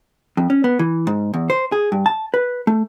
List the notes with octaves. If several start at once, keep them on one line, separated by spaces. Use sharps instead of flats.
F2
C#4
B3
E3
G#2
E2
C5
G#4
G2
A5
B4
A3